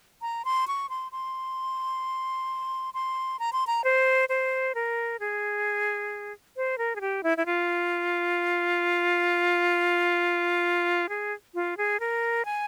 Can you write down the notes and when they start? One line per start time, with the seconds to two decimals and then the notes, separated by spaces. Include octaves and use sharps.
0.22 A#5
0.45 C6
0.68 C#6
0.89 C6
1.12 C6
2.94 C6
3.39 A#5
3.53 C6
3.67 A#5
3.84 C5
4.29 C5
4.75 A#4
5.20 G#4
6.56 C5
6.78 A#4
6.96 G#4
7.01 G4
7.23 E4
7.37 E4
7.46 F4
11.09 G#4
11.55 F4
11.77 G#4
12.00 A#4
12.45 G#5